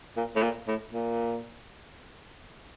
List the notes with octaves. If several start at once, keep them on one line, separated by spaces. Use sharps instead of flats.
A#2
A2
A#2
A2
A#2